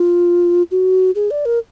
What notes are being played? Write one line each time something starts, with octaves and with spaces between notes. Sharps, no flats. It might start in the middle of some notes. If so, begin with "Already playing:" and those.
Already playing: F4
F#4
G#4
D5
A#4